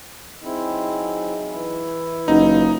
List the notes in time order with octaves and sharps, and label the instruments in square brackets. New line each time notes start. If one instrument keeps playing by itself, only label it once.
[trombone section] F#3 D#4 G#4 [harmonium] C4 E4
[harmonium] E3 E4
[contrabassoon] F#1 [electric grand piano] D#4 [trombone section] F4 F#4